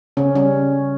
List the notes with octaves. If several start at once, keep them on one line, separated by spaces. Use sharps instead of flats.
C#3 C#4
G3 C#4